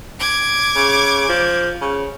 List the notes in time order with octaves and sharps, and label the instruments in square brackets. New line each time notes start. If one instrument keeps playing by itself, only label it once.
[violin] D6 G#6
[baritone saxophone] C#3
F3
C#3